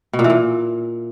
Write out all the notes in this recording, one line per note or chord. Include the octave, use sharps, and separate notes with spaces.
B2
A#2
E3
A#2